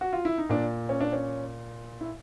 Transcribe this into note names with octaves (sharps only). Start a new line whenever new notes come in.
F#4
F4
E4
D#4
A#2 D4
C#4
D4
C#4
E4